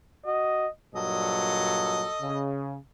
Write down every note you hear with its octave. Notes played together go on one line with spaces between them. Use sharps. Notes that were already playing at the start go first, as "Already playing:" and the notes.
F#4 D#5
G2 A#2 F#3 A4 D#5
C#3